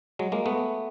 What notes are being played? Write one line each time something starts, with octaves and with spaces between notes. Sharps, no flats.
F#3 G#3
G#3 A#3
A3 B3